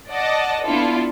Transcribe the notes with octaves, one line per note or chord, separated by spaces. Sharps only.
D5 D#5 F#5 A5
B3 D4 E4 F4 A4